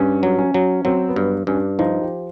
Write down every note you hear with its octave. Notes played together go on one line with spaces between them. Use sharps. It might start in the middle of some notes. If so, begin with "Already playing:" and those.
Already playing: G2 C#4
F#3
C#4
F#3
F#3 C4
B3
G2
G2 C#4
D4
F3 D#4
G4